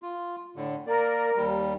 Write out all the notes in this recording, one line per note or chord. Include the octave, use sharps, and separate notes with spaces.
F4
A2 D3
A#3 A#4 D5
D#2 G3